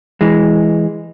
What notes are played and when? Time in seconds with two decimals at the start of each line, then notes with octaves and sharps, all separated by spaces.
0.21 E3 G#3